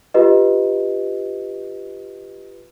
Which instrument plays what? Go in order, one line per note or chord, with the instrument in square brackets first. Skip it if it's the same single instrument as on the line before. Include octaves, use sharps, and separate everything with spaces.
[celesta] F4 G4 B4 D#5